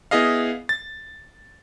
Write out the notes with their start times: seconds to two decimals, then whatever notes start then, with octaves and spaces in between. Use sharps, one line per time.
0.11 B3 E4 G#4 D#5 F5
0.69 A6